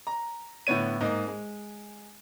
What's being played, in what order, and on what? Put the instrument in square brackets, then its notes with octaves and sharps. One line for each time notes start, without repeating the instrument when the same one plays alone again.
[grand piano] A#5
A2 D3 B3 C#5 D#7
G#2 A#3 D#4
G#3